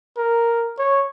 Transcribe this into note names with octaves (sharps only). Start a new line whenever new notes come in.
A#4
C#5